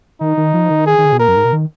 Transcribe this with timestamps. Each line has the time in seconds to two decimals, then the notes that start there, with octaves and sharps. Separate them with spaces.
0.21 D#3 D#4
0.37 D#3
0.54 F3
0.70 D#3
0.87 G#4
0.98 D#3
1.05 D3
1.12 B2
1.20 A#2 A#4
1.28 F#2
1.36 G#2
1.45 B2
1.53 D#3